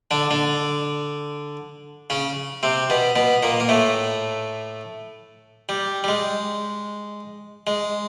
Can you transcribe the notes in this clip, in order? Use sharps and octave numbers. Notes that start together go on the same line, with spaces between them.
D3 D4
D3 D4
C#3 C#4
C3 C4
B2 B3
B2 B3
A#2 A#3
A#3
A2 A3
G3
G3
G#3
G#3